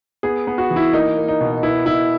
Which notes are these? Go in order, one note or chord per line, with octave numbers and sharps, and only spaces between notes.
B3 G#4
B3
F#4
E3
E4
A#3 D#4
A#3
D#4
B2
B3 E4
B2 E4